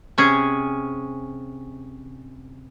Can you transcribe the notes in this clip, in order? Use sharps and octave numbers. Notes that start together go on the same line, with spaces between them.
C3 C#4 G#4